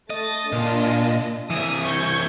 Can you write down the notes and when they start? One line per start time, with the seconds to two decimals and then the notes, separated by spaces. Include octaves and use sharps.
0.10 A3 D#5 A6
0.52 A#2 D4 F4 D#5
1.50 C2 E3 E5 D#6
1.84 C#6 G6 G#6